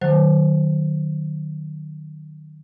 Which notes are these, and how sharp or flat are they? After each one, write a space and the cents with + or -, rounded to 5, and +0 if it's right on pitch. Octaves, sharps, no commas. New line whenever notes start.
D#3 -35 F#3 +0 C5 +0